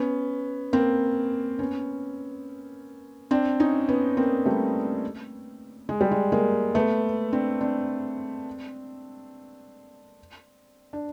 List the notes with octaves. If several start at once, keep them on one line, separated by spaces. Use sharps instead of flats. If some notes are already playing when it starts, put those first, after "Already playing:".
Already playing: B3 C#4
A#3 C4
B3 C#4
C4 D4
C#4 D#4
B3 C#4
A#3 C4
G3 A3
G#3
G3
G#3
G#3 A#3
A3 B3
C4 D4
C4 D4
D4